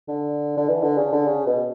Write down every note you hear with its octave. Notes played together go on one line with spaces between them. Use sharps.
D3
D3
E3
D3
C#3
D3
C#3
B2